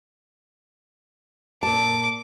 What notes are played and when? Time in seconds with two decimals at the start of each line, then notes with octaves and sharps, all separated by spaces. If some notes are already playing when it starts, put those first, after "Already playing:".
1.63 A#2 A5 D6